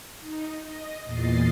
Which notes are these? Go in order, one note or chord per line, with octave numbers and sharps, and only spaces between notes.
D#4
D#5
E2 A#2 D#5 A6 C7